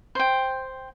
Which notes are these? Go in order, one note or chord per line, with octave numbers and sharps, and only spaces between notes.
C5 G5